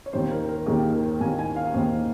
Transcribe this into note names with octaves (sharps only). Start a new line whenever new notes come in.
C#5
D#2 D#3 A#3 C5
A#4
A#4
D#2 D#3 A#3 G#4
A#4
D#2 D#3 A#3 G#5
G#5
F5
D#2 D#3 A#3 C5